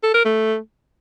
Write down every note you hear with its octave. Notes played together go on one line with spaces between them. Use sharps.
A4
A#4
A3